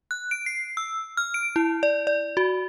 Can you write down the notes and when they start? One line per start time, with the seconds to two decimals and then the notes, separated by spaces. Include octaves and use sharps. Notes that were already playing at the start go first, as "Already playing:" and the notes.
0.11 F#6
0.31 D7
0.46 C7
0.77 E6
1.17 F6
1.34 D7
1.56 E4
1.83 D5
2.07 D5
2.37 F#4